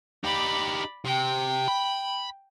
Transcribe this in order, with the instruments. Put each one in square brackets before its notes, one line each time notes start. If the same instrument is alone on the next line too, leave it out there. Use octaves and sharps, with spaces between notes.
[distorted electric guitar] D#4 G4 [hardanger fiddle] D5 B5
[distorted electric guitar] C3 [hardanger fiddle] G5
[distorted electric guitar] B5